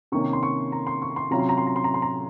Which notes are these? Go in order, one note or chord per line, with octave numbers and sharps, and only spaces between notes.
C3 D#3 A#3 C#4 C#6
C6
C#6
A#5
C6
C#6
C6
C3 F#3 C#4 F4 A#5
C6
A#5
C6
A#5
C6
A#5
C6
A#5